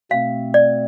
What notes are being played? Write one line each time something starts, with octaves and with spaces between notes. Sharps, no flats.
B2 A3 C4 F5
D5